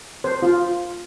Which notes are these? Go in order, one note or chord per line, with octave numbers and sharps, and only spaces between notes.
C5
F4